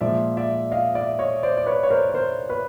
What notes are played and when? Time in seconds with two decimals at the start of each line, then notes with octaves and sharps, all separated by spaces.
0.01 A#2 F3 G#3 D5 E5
0.37 D5 E5
0.72 D#5 F5
0.95 D5 E5
1.19 C#5 D#5
1.43 C5 D5
1.57 D5
1.66 B4 C#5
1.83 C#5
1.90 A#4 C5
2.10 C#5
2.14 A#4 C5
2.49 B4 C#5